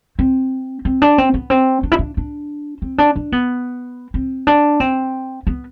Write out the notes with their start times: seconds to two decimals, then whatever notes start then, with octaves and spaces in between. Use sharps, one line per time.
0.19 C4
0.85 C4
1.02 D4
1.18 C4
1.34 B3
1.50 C4
1.83 D4
1.92 E4
1.99 D4
2.17 D4
2.82 C4
2.98 D4
3.16 D4
3.32 B3
4.14 C4
4.47 D4
4.80 C4
5.47 B3